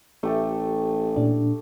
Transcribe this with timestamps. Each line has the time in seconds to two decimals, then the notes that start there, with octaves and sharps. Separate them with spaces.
0.23 A1 A3 G4 A4
1.16 A#2 D4